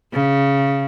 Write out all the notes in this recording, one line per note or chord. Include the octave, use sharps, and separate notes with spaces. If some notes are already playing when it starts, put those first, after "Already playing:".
C#3